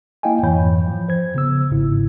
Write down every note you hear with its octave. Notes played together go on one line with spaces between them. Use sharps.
A#3 E4 D#5 F5 G5 G#5
F2 G#2 E3 C#5 B5 G6
F3
C5 G#6
C#3 B3 E6
G1 G#2 C#3 E4